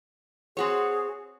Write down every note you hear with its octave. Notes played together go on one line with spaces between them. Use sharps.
C4 F#4 G#4 C#5